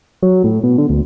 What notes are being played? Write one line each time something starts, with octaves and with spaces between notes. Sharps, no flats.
F#3
A2
B2
D3
D2